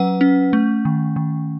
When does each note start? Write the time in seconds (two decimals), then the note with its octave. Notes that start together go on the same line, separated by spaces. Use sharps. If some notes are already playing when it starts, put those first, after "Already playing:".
Already playing: F#3 C#4 B4 F#5
0.21 C#4
0.53 A3
0.85 D#3
1.16 D#3